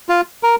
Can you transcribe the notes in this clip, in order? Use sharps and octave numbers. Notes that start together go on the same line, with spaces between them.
F4
A#4